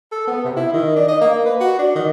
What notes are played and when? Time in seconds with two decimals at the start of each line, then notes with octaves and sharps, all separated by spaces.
0.12 A4
0.27 B3
0.45 C3
0.57 E4
0.73 D#3
0.96 D4
1.08 D#5
1.21 A#3
1.45 B4
1.60 F#4
1.79 D4
1.95 D#3